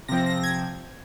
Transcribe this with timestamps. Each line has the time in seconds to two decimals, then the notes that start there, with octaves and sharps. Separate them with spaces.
0.08 C3 F3 C4 A#6
0.26 A#6
0.43 G#6